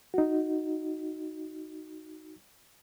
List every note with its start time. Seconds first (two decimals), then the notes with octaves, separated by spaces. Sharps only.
0.14 D#4 F#4